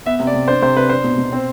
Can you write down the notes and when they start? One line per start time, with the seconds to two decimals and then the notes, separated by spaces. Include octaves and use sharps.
0.06 B3 E5
0.19 C3
0.27 D5
0.34 C3
0.48 D4 C5
0.62 C3 C5
0.76 C3 B4
0.89 D4 C5
1.04 B2
1.18 B2
1.33 C4